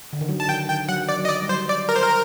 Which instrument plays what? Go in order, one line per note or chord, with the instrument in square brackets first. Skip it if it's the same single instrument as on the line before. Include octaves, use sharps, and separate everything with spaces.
[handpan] D3
D#3
F#3
[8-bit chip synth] A5
[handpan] D#3 [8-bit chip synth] G5
[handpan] D#3 [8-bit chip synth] G5
[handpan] F#3 [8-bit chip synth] F#5
[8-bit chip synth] D5
[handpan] F#3
[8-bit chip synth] D#5
D5
[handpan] G3
[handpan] F#3 [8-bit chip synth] C5
[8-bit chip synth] D5
A#4
C5
A#4